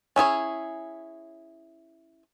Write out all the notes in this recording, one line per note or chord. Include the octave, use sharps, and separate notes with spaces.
C#4 E4 G#4 C#5